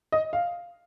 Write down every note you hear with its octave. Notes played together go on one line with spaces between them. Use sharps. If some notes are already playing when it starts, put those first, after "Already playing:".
D#5
F5